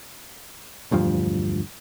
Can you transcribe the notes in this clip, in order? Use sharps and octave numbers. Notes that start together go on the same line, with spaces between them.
E1 D2 G2 F3